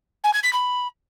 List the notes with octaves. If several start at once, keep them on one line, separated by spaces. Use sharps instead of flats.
G#5
G#6
B6
B5